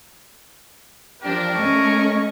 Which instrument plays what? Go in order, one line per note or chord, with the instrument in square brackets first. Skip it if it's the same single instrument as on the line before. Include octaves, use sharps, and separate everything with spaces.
[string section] F3 D4 G4 [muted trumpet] A#4
[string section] A3 C#4 [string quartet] D#5 C#6